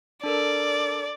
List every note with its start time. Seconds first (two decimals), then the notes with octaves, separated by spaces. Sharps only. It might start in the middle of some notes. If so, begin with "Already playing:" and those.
0.24 D4 A4 A#4 D5